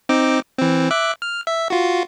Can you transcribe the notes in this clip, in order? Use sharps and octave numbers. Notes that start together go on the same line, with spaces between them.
C4 D#4 D6
E3 C4
E5 D6 F#6
F6
E5
F4 F#4